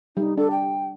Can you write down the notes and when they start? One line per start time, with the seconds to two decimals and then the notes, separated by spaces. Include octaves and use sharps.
0.17 G3 D#4
0.37 D4 A4
0.51 G5